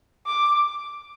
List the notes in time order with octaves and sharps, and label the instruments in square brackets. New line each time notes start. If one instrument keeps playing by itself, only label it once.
[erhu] D6